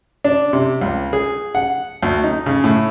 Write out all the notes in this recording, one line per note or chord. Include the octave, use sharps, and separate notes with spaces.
D4
C3
C#2
G#4
F#5
D2
D#4
C#3
A2